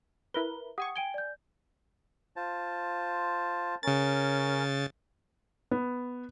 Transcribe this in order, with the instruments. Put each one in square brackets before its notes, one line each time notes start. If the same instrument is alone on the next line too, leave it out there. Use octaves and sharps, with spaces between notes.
[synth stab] E4 A#4 B4 [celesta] G7
[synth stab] G4 G#5 C#6 [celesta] F#5 D#6
[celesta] G5 D7 G7 [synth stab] G#5
[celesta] D5 G6
[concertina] F4 C5 A5
[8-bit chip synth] C#3 A6 [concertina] C#4 A#4
[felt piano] B3